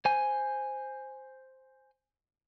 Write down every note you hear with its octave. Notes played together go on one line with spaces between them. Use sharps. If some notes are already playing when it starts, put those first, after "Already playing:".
C5 G#5